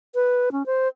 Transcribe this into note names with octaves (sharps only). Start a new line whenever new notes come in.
B4
C#4
C5